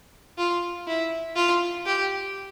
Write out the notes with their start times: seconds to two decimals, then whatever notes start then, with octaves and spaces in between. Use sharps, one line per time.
0.38 F4
0.87 E4
1.36 F4
1.86 G4